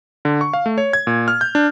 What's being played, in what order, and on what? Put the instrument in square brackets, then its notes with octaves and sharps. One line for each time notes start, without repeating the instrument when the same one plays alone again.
[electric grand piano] D3
C#6
F5
A3
C#5
G#6
A#2
F6
G6
D4